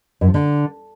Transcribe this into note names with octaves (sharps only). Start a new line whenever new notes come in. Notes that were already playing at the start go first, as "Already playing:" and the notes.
F#2
F3
D3